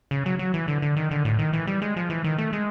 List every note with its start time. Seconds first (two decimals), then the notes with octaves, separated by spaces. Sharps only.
0.11 C#3
0.26 F#3
0.39 F#3
0.54 E3
0.68 D3
0.82 D3
0.96 D#3
1.11 D3
1.25 A2
1.39 D#3
1.53 E3
1.67 G3
1.82 G#3
1.96 F3
2.10 E3
2.24 D#3
2.38 A3
2.53 G#3